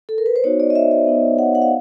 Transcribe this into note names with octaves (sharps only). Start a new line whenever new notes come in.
A4
A#4
B4
C5
B3 D#4 F#4 C#5
D5
D#5
E5
E5
B3 D#4 F#4
F#5
F#5
F5